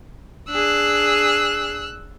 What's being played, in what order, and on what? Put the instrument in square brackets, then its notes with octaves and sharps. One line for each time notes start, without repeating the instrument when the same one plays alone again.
[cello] D4 G#4 [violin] E6 F#6